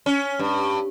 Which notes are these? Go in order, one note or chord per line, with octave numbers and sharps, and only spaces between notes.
C#4
G2